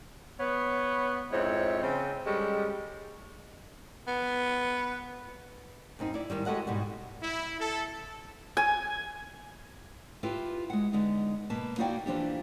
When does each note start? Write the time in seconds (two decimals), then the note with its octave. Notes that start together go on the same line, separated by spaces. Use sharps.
0.39 B3 C#5
1.32 F2 G#2 C4 E4 C#5
1.82 C#3 C4
2.26 G3 G#3 C#4 G4 A4
4.07 B3
5.99 F#2 C4 D#4
6.14 E4 D5
6.30 G#2 B2 D#3 G3
6.46 G#3 F#4 G4 A4 D#5 F#5
6.67 G#2 B2 G3 F#4
7.21 E4
7.59 A4
8.57 G#5
10.23 E4 F4 G4 B4
10.70 G#3 F#5
10.93 D3 G#3 B3 D#4
11.50 B2 A#3 B4 A5
11.78 A#3 D#4 E4 F#4 D5 G5
12.06 E3 F3 D4 G4